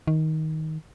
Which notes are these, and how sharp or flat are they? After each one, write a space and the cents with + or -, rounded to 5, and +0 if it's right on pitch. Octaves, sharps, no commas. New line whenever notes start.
D#3 +15